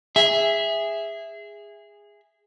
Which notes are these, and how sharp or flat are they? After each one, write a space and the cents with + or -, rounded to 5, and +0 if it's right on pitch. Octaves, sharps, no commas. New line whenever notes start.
G#4 -15 E5 +0